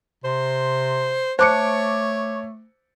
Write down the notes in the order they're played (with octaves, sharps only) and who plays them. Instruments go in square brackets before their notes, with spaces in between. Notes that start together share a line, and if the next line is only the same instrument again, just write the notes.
[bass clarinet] C3 [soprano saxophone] C5
[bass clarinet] A3 [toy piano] C5 [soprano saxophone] C#5 [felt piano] A5 D6 C#7